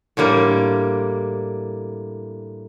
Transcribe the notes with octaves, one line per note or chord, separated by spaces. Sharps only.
A2 D3 G3 A#3